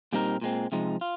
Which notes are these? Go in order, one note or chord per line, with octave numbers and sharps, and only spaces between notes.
A#2 G3 C4 D#4 A#4
A#2 G#3 C4
C3 F3 G#3 D#4
F4